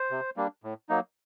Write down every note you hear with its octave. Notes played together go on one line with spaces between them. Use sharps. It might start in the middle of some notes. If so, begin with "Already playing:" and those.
Already playing: C5
C3
G3 A#3 D4
A2
F#3 A#3 D#4